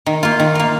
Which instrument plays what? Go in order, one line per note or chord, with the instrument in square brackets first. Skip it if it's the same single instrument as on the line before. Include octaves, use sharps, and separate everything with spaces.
[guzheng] D#3
A#3 F4
D#3
A#3 F4